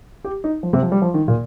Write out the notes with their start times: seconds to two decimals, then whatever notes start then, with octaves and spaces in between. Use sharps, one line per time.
0.24 G4
0.44 D#4
0.63 F3
0.73 C3
0.83 F3
0.92 G3
1.02 F3
1.14 D#3
1.28 A#2